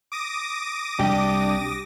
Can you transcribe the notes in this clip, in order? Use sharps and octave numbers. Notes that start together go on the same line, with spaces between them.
D6 D#6 A#6
C2 D4 G4